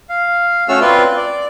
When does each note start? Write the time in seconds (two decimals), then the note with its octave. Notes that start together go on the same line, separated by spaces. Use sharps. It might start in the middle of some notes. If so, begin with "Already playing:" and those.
0.10 F5
0.69 A3 C#4 F#4 A4 E6 F6
0.81 C4 F4 B4 D5 C6
1.17 D5